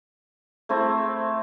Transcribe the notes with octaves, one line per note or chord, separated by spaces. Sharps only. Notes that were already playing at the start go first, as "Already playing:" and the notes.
A3 C4 E4